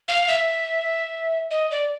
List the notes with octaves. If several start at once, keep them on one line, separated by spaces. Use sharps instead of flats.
F5
E5
D#5
D5